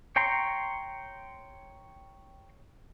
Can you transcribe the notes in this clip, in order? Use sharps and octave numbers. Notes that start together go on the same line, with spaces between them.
C#5 G5 A#5 C6 C#6